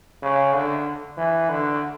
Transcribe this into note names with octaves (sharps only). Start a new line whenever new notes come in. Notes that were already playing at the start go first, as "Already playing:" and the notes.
C#3
D3
E3
D3